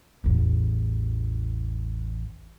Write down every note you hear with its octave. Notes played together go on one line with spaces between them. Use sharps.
A1 E2